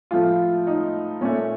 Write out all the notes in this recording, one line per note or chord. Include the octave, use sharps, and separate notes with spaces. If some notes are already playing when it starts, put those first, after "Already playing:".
A2 F3 A3 F4
D#4
A#2 A3 C#4